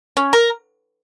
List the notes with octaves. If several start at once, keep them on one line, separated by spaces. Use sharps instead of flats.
C#4
A#4